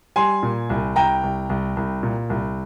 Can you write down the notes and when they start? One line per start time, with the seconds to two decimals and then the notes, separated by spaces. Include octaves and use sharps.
0.16 G3 G#5 C6
0.43 A#2
0.70 C2
0.96 C2 G5 A#5
1.23 C2
1.49 C2
1.77 C2
2.03 A#2
2.30 C2